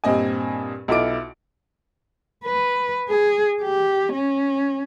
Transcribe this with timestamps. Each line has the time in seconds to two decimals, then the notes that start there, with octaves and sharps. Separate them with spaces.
0.04 G2 A#2 C4 D#5 G#5
0.88 B1 E4 F4 A4 D6 D7
2.45 B4
3.09 G#4
3.62 G4
4.13 C#4